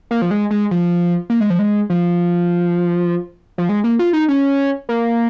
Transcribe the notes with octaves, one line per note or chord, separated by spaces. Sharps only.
A#3
F3
G#3
G#3
F3
A#3
G#3
F3
G#3
F3
F3
G#3
A#3
F4
D#4
C#4
A#3